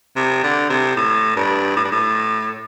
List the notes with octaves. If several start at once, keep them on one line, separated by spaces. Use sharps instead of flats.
C3
D3
C3
A2
G2
A2
G2
A2